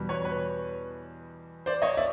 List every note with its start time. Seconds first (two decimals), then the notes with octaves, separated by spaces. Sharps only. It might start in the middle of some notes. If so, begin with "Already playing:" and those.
Already playing: E2 B2 G3 B3
0.09 B4 C#5
0.25 B4 C#5
1.66 C5 D5
1.82 C#5 D#5
1.97 D5 E5